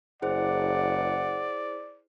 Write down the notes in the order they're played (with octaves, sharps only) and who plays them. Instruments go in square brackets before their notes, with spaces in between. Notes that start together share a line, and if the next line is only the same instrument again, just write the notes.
[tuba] F#1 [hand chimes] E4 G#4 C5 [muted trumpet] D5 [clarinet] F#5